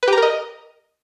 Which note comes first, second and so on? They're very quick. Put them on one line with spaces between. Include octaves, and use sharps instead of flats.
B4 G4 A#5 A#4 D#5